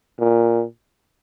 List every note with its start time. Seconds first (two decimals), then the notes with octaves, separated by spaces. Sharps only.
0.20 A#2